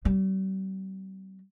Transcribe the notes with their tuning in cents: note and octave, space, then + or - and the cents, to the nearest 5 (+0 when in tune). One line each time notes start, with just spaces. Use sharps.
G3 -45 C4 -35